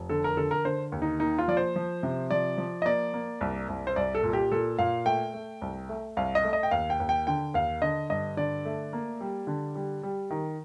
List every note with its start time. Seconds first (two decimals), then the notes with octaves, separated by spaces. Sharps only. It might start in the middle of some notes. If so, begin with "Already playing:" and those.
Already playing: F1
0.09 D3 A4
0.24 A#4
0.37 D3 A4
0.51 A#4
0.65 D3 C5
0.92 D#2
1.02 D#4
1.20 A#3 D#4
1.38 F4
1.48 F3 D5
1.57 C5
1.76 F3
2.03 C3
2.31 F3 D5
2.58 F3
2.82 D#5
2.85 A#3 D5
3.14 A#3
3.41 C2
3.69 C2
3.87 C5
3.96 C2 D5
4.15 A4
4.23 A#2
4.33 G4
4.52 A#2 A4
4.79 A#2 F5
5.06 A3 G5
5.34 A3
5.62 C2
5.89 A3
6.17 C2 F5
6.35 D#5
6.44 A3
6.53 D#5
6.63 G5
6.71 D#2 F5
6.90 G5
7.00 D#2
7.09 G5
7.27 D3 G5
7.54 D#2 F5
7.82 D3 D#5
8.10 G2 D#5
8.37 D3 D5
8.65 A3
8.93 A#3
9.21 G3
9.47 D3
9.75 G3
10.03 G3
10.30 D#3